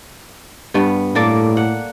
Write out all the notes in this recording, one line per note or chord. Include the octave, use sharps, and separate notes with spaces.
G2 B3
A2 A#3 A4 D5
F#5